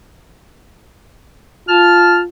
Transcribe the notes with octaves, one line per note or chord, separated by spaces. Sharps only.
F4 A5 F6